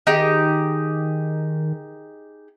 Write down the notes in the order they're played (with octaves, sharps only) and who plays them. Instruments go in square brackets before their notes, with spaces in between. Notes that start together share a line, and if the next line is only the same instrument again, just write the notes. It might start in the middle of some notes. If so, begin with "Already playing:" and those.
[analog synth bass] D#3 [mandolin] D#4 G4 G#4